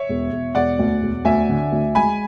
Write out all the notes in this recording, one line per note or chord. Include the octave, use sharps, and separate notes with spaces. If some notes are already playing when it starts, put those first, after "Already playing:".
Already playing: C#5 E5
E1
E1
E1 D5 F#5
D2
E1
D2 E5 G#5
D3
D2
G#3 G#5 B5